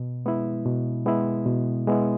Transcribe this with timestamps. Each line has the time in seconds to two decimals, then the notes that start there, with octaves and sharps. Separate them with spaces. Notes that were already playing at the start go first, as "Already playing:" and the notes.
Already playing: B2
0.26 G#3 B3 E4
0.66 B2
1.06 G#3 B3 E4
1.46 B2
1.87 G#3 B3 E4